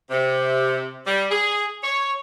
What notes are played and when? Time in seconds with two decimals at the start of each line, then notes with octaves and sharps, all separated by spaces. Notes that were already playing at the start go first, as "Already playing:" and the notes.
0.10 C3
1.06 G3
1.30 G#4
1.83 C#5